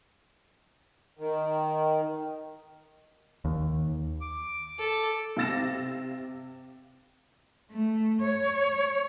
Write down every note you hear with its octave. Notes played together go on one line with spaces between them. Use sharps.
D#3
D#2
D6
A4
C3 F5 E6 A6 A#6 E7
A3
C#5